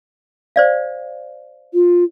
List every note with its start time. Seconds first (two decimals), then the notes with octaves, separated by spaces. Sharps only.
0.56 C5 D5 F5
1.74 F4